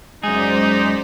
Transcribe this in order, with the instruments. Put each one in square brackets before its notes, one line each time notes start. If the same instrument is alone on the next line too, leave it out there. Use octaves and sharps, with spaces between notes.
[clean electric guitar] F#2 G#4 [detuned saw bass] G#3 [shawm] D#4 [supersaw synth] C5 D5 B6